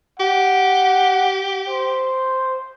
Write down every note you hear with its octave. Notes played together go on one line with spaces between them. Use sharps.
G4 F#5
C5